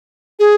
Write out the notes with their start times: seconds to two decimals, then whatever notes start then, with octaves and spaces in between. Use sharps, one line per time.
0.39 G#4